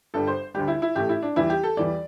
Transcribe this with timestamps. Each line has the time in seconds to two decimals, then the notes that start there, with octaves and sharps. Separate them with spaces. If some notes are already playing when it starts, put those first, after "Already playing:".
0.14 G1 G2 G3 A4
0.27 C5
0.54 D2 D3 G3 G4
0.68 E4
0.82 E4
0.95 A1 A2 A3 G4
1.09 E4
1.23 D4
1.36 E2 E3 G3 E4
1.50 G4
1.63 A4
1.77 E2 E3 G3 D5